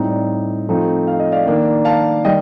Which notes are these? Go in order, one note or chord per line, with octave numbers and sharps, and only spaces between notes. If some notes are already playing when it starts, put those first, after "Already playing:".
Already playing: A2 G3 C4 D#4
D5
F3 A3 C4 D#4
F5
D#5
D5 F5
D#3 A#3 D4
F5 A5
D#3 G3 D#5 G5